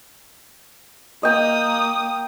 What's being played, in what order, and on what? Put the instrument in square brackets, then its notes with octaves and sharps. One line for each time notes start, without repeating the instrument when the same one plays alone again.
[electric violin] A#3 D#6 [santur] D#5 G5